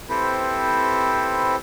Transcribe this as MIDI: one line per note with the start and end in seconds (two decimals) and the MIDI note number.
0.09 1.56 60
0.09 1.56 64
0.09 1.56 67
0.09 1.56 69
0.09 1.56 71
0.09 1.56 72